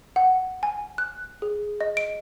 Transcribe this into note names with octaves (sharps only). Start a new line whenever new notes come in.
F#5
G#5
F#6
G#4
D#5
D7